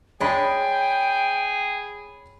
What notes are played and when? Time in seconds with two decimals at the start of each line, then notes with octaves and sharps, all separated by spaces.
0.20 G#3 D4 G#4 C#5 G5 B5